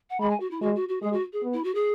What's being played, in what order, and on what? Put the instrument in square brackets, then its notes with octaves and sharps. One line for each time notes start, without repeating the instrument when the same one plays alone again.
[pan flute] F#5
[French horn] G#3 [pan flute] B5
[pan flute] G#5
F#4
E4
[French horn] G#3 [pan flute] F#4
[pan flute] F#4
F#4
[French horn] G#3 [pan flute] G#4
[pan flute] F#4
G#4
[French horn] B3
[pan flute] E4
F#4
G#4